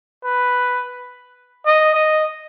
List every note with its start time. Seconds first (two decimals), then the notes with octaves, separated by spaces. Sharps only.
0.24 B4
1.66 D#5
1.94 D#5